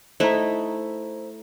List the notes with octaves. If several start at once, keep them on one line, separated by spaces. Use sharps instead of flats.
A3 D#4 E4 C5 A#5